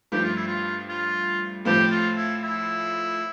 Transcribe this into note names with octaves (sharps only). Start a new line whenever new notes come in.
G2 F3 A3 G4
F4
E4
F4
F4
A2 F3 C4 G4
F4
E4
E4